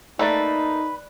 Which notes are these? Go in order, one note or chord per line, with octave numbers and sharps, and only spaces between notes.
A3 A#3 D#4 A4 B4 D5